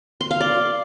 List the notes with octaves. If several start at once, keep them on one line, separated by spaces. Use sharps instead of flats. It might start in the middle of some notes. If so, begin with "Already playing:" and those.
C6
F5
D5